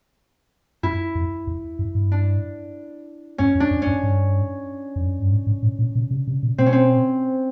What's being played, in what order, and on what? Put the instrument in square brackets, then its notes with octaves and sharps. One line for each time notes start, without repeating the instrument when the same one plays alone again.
[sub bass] F#2 [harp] E4
[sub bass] F2
E2
F#2
G2
[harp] D4
[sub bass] F#2 [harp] C#4
[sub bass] F2
[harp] D4
[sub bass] F2
[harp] C#4
[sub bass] F#2
G2
F2
F#2
G2
G#2
G#2
A2
A#2
B2
C3
C3
B2
[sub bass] B2 [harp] C4
[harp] C#4
C4